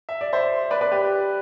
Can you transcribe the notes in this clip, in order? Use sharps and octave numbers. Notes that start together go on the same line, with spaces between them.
E5
D5
C5 E5
B4 D5
B4 D5
G4 B4